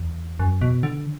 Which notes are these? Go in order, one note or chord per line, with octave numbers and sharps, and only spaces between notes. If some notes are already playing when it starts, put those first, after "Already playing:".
Already playing: E2
F#2
B2
D3